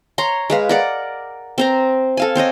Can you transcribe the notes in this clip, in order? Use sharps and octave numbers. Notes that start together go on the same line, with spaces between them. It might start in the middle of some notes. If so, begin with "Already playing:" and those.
C#5 A#5 C6
G#3 B4 F5
A#4 D5 F#5
C4 C5 A#5
A4 F5 G#5
C4 C5 C#5 D#5